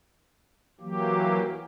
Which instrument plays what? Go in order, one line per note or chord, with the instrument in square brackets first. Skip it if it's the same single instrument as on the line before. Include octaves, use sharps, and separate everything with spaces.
[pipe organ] E3 F#3 A#3 G4